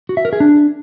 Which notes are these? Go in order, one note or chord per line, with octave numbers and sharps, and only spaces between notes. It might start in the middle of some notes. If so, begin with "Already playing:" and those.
F#4
E5
A#4
G#4
D4